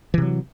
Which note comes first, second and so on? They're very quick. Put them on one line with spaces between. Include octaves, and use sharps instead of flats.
E3 C3 F#3